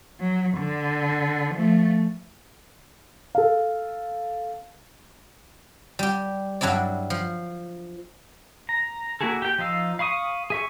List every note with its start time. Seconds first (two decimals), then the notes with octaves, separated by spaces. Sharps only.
0.21 F#3
0.57 D3
1.55 F3 A3
3.35 A4 F5
5.99 G3 G4
6.61 G2 F#3 D4 E4 D5
7.10 F3
8.69 A#5
9.21 A#3 E4 F#4 G#4 A4
9.42 G4 G5
9.58 F3 D#4 F5 E6
9.99 F5 B5 C#6 D#6
10.50 G#4 E5 C#6